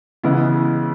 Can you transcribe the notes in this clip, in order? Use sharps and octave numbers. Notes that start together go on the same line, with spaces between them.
C#3 E3 G#3 B3 E4